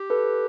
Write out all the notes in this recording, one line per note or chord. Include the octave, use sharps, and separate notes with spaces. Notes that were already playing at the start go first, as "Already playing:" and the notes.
Already playing: G4
A4 B4